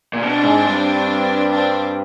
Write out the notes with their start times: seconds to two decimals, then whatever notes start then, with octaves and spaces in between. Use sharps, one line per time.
0.13 A#2
0.22 B2 C4 D4
0.44 G#2
0.66 G2
1.52 C4 D4